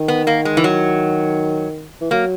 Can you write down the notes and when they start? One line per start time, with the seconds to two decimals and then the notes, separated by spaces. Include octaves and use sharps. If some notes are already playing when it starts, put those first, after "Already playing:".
Already playing: D#3
0.08 B3
0.27 A#3
0.45 G#3
0.57 E3
0.64 F#3
2.01 E3
2.11 F#3 A#3